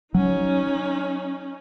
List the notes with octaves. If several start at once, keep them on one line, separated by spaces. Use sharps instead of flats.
F#3 C#4 D#4